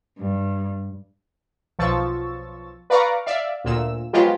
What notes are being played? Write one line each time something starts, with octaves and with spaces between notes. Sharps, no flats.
G2
B1 F3 C#6 E6 A6
B4 D5 F5 A#5 C#6 D6
D5 E5 F5
D2 A#2 E6
F3 F#3 G#3 B3 F4 G4